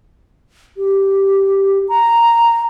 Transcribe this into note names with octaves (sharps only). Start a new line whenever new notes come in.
G4
A#5